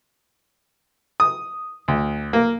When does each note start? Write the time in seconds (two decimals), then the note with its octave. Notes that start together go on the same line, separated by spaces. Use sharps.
1.20 D#6
1.88 D2
2.33 A#3